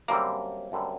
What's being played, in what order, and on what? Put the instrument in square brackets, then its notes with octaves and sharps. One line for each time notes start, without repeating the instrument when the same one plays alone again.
[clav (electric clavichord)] F#2 D3 G3 C4 [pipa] A#3
[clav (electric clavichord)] F#2 D3 G3 C4